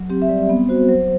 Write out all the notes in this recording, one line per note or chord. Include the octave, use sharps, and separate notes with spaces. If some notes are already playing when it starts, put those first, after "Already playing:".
Already playing: F#3
C4 G4
E5
G3 D5
B3
F#4 C5
F#3 C5